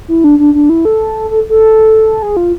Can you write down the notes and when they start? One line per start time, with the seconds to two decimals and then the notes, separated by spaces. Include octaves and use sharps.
0.08 E4
0.24 D4
0.39 D4
0.54 D4
0.69 E4
0.85 A4
1.30 A4
1.49 A4
2.22 G#4
2.37 F4